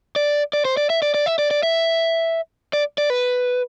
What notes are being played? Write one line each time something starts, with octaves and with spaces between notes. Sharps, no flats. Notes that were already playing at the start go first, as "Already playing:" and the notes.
D5
D5
C5
D5
E5
D5
D5
E5
D5
D5
E5
D5
D5
B4